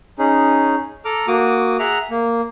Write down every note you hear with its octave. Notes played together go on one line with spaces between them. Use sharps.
C#4 D#4 G#4
A4 A#5 D6 F6
A#3 F#4 D6 D#6
G#4 E5 F#5 A#5
A#3